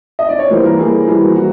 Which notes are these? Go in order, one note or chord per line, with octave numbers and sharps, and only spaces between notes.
D#5
D5
C#5
E3 G3 A#3 C5
A#4
E3 G3 A#3 G#4
E3 G3 A#3 G#4
F#4
E3 F#4